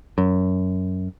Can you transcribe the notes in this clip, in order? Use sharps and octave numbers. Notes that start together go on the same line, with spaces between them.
F#2